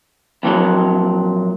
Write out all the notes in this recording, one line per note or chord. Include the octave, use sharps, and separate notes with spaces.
F2 A#2 E3 F#3